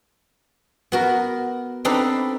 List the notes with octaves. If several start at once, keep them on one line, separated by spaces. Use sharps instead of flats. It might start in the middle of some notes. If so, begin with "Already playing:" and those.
B3 F#4 A#4
C4 D4 D#4 A4 B4